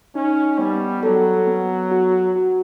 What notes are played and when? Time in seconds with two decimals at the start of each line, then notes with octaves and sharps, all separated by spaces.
0.15 C#4 D#4
0.59 G3 B3
1.03 F#3 A4
1.47 B3
1.91 F#4
2.36 F#4